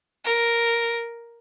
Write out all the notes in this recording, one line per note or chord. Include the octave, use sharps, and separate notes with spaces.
A#4